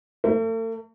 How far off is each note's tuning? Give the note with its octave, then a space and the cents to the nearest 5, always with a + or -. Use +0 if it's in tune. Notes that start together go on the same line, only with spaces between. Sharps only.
A3 +40